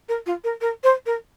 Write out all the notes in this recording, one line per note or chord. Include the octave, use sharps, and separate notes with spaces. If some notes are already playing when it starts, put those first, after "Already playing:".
A#4
F4
A#4
A#4
C5
A#4